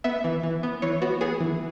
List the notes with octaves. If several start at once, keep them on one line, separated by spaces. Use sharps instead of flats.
B3 E5
E3
E3
B3
E3 C#5
B3 F#4
B3 G#4
E3